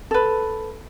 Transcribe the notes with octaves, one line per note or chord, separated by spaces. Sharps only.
A4 B4